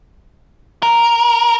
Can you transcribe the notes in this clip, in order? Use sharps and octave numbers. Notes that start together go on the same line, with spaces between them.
A#4